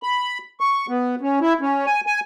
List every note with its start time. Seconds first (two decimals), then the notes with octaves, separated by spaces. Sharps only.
0.03 B5
0.60 C#6
0.89 B3
1.21 C#4
1.41 E4
1.61 C#4
1.86 G#5
2.06 G#5